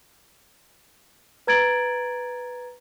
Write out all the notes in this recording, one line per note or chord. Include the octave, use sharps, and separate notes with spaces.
B4 A#5 G#6 A6 D7 F#7